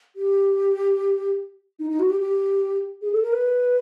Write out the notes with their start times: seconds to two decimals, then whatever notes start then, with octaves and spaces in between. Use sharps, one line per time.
0.16 G4
1.79 D#4
1.90 D#4
1.99 F#4
2.10 G4
2.20 G4
3.02 G#4
3.12 A4
3.22 A#4
3.32 B4